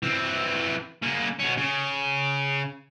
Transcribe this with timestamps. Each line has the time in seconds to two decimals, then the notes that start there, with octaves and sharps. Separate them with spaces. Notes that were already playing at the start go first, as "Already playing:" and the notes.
0.03 E3 C4
1.02 C#3 A#3
1.39 B2 C#4
1.57 C#3